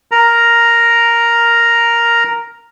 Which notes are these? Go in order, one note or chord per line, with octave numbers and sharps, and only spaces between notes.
A#4 A#5